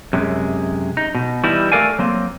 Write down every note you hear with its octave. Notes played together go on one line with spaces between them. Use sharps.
F#2 C3 G#3
D#4
B2
E3 G3 D#4 E4
A3 A4 A#4 D5 F5 G#5
F#3 A#3 C4